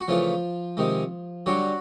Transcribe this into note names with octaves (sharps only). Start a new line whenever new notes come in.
F#4
C#3 E3 F3 A3 F4
C3 D#3 G#3
D3 F#3 G3 F#4